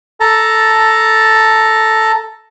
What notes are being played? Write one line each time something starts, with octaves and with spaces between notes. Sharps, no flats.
A4 A5 A#5